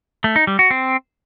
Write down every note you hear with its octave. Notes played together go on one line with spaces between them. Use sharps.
A3
D#4
G3
F#4
C4